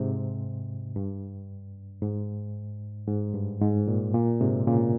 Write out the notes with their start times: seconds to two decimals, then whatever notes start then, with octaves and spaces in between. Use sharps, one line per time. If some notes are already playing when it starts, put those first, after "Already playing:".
Already playing: G#2 C3
0.96 G2
2.02 G#2
3.08 G#2
3.34 G2
3.61 G#2
3.88 A#2
4.14 A#2
4.41 G#2 C3
4.67 A#2 C#3